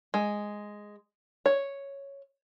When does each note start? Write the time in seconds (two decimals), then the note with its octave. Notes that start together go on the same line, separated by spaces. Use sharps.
0.14 G#3
1.46 C#5